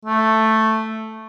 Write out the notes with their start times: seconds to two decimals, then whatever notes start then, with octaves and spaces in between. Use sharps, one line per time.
0.05 A3